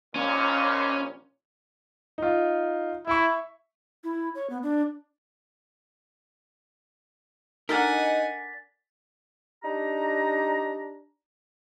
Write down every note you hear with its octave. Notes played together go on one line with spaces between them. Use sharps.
A#1 D#2 A#2 C#4
D#4 F4
E4 E5 C#6
E4
C#5
B3
D4
D4 D#4 A4 A#4 F#5 G#5 A6 B6
D4 D#4 G4 A#5